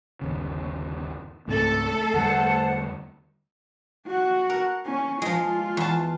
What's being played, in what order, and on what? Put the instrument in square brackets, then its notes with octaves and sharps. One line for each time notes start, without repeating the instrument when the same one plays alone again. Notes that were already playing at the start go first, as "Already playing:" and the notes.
[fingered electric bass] G1 D#2 C#3
[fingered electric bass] C#2 G#2 C4 [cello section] A3 A4
[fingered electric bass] E2 D3 G3 [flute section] C5 F#5 A5
[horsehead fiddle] F#4 F#5
[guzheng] A#4
[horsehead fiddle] C#4
[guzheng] F3 G#3 [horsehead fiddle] F4
[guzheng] E2 A5